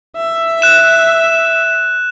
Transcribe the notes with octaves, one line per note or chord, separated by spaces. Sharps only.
E5
F#6 E7